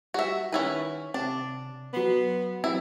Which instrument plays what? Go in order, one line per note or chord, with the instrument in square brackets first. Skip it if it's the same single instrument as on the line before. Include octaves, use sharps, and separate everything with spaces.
[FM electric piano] G3 [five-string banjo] F#4 E5
[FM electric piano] D#3 [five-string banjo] C#4 E4 B4
[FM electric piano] C3 [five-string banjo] D4
[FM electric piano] F#3 C6 F#6 [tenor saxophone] B3
[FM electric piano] C3 E3 F#3 [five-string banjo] E4